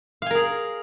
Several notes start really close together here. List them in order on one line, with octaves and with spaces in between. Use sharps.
F5 G#5 A#4 G#4